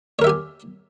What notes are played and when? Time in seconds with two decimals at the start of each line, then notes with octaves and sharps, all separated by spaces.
0.19 C#5
0.22 A#4
0.24 E5
0.27 G4
0.29 G#5